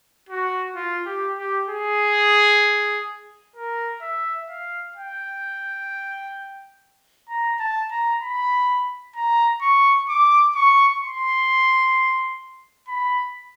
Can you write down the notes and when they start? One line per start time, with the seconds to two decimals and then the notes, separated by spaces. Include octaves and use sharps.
0.29 F#4
0.76 F4
1.06 G4
1.39 G4
1.70 G#4
3.56 A#4
4.02 E5
4.50 F5
4.96 G5
7.29 A#5
7.60 A5
7.91 A#5
8.22 B5
9.16 A#5
9.62 C#6
10.09 D6
10.55 C#6
11.02 C6
12.88 B5